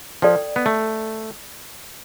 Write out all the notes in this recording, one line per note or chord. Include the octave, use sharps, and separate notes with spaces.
F3 A4 D5 G5
B3
A3